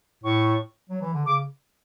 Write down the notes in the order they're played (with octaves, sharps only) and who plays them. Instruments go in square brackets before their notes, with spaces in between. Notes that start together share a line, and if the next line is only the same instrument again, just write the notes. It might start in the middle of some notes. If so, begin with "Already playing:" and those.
[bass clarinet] A2 [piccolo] C#6
[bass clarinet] F#3
E3
D3
[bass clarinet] C#3 [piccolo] D6